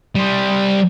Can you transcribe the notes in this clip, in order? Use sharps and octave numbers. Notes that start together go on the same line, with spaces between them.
G3 C5